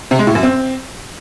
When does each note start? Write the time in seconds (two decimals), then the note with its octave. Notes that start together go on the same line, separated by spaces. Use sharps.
0.11 C3
0.19 G#3
0.27 A2
0.35 F#2
0.43 C4